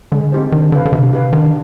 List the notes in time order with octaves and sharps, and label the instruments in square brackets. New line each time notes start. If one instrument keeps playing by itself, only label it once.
[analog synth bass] D3 [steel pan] G#3
[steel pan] C4 D#4 G4 C5
[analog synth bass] D#3 [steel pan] D4
[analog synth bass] D3 [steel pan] G4 B4 F5
[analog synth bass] D3
[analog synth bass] C3 [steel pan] D4
[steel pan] G4 B4 F5
[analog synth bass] D#3 [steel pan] D4